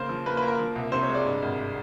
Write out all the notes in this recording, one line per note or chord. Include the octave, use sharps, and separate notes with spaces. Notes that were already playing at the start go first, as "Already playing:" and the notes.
Already playing: C#3 A#3 C5
F3
A#3 B4
B4
A#3
A#4
F3
C2
C3 C5
C#5
G#3
D5
G2
G#1